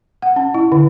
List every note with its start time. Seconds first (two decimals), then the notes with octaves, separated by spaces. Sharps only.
0.22 F#5
0.36 C#4
0.54 E4
0.72 D3